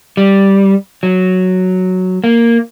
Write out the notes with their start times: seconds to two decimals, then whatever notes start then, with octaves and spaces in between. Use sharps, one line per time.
0.17 G3
1.03 F#3
2.24 A#3